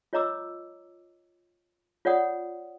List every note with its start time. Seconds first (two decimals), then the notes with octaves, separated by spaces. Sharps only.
0.13 F4 C#5 D#5 A#5 D6 E6
2.05 F4 C#5 D5 F#5 D#6